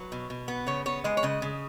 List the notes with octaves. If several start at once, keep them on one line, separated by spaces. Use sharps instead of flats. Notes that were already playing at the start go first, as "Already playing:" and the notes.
Already playing: F#3 B4
B2
B2
B3
C#3 C#5
B3 C#5
G#3 D#5
C#5
C#3 D#5
C#3